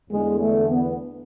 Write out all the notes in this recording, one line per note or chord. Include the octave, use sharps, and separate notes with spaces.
E2 D3 G#3
A3
B3